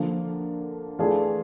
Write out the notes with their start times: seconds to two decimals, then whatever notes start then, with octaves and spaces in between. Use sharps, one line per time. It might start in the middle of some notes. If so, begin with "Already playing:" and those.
Already playing: D3 F3 A#3
0.99 E3 A3 D4 F4 G#4